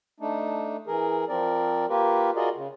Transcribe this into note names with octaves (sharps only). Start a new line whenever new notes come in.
A3 D4 D#4
E3 G#4 A#4
F3 C4 A#4 D5
A#3 F4 G4 A#4 B4
F4 F#4 G#4 A#4 D5 D#5
C#3